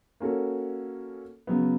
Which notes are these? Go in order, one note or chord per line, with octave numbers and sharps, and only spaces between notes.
A#3 C#4 F#4 A4
C#3 F#3 B3